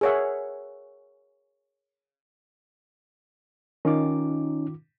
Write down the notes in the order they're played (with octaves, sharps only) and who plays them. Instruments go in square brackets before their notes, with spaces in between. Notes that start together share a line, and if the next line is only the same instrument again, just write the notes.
[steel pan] G#4 A#4 C#5 E5 F#5
[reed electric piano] D#3 F4 D6 [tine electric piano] C#4 D#4